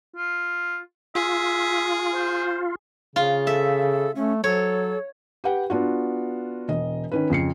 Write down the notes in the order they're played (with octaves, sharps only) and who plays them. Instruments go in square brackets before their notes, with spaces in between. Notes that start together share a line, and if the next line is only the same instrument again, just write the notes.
[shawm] F4
[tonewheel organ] F4 [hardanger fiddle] G#4 [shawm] E5
[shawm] C5
[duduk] C#3 [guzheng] F4
[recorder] A4 [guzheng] E5
[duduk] A3 [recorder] C#4
[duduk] F#3 [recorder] A4 [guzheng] C#5
[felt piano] G4 B4 F#5 G5
B3 D4 F4 F#4
E1 D#5
D#3 C#4 B4
F2 C#3 C7 C#7